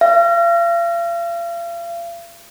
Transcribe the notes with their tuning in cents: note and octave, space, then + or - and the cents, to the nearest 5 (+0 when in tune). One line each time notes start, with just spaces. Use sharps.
F5 -40